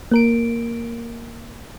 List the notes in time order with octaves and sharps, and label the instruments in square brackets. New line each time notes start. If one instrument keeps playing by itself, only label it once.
[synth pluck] A#3 A#4 D7